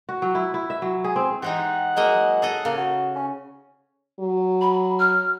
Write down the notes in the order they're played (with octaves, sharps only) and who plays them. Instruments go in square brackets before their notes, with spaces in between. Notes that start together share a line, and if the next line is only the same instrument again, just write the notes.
[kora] F#4
F#3
E4
E4
E5
F#3
G#4
C4
[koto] E3 G#3 D#4 [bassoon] G4 [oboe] F#5
[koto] F#3 A#3 D#5 [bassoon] G#3
[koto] G#4 A4 D#5
[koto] C#3 [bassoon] A#3
[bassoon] F#4
C#4
[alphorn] F#3
[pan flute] B5
F6